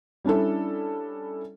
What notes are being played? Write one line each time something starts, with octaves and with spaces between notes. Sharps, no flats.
G3 C#4 D4 E4 A4